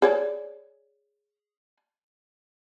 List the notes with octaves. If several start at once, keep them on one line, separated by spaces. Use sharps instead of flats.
G#4 C#5 D5